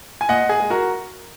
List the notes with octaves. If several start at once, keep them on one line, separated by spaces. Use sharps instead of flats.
G#5
A#2 D#5 F#5
G#4
G#3
F#4 A#4